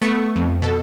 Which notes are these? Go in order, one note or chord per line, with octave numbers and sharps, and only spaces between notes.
A3 B3 C#6
F2
B2 A4